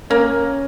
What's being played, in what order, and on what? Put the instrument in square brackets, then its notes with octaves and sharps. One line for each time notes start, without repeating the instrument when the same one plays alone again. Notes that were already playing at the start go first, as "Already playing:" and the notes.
[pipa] A#3 [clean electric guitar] C#4